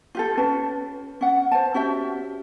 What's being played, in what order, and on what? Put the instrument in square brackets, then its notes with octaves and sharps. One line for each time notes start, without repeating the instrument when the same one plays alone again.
[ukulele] F4 G4 A4
C#4 B4 A5
C#4 F#5
C5 A5
C#4 F#4 G4 E5